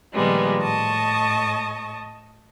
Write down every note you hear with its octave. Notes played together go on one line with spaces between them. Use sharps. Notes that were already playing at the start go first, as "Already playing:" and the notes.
A#2 D#3 F3 G3 G#3 B3
A2 D#5 A5 C#6